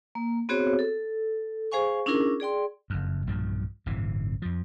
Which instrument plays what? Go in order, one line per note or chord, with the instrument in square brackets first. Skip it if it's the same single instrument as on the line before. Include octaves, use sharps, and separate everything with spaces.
[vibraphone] A#3
B3 C4 F#4 G#4 C5 C#5
A4
G#4 C5 F5 G#5 C#6
C#4 D4 E4 F4 G#4 A#4
G#4 D5 G5 C6
[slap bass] F#1 F2
B1 G2 A#2 F3
D1 G1 C3 E3
F2 F3